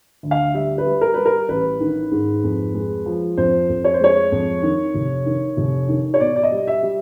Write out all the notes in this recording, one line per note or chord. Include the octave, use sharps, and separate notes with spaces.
D2
F5
G3 E5
B4
G3
A#4
G3 B4
A#4
A1 B4
D#3
G#2
F2
G#3
F3
F2 C5
F2
C#5
C5
G#3 C#5
F2
D#3
F1
D#3
F1
D#3
C#5
B2 D5
D5
D#5
G3
E5
G3